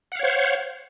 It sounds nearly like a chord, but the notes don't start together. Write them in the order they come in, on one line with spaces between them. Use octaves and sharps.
F#5 F5 C#5 C5